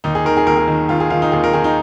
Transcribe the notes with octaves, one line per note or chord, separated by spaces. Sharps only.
D#2 D#4
G#4
D#3 A#4
G#4
D#2 A#4
G#4
D#3
D#2 F4
G#4
D#3 F4
D#4
D#2 G#4
A#4
D#3 G#4
D#4